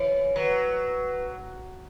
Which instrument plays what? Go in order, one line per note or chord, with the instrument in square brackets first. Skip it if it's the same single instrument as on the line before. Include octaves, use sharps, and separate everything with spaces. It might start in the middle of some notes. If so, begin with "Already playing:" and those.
Already playing: [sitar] E3 [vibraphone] C#5
[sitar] F#3 [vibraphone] B4